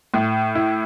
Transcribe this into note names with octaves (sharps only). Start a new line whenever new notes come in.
A2
E4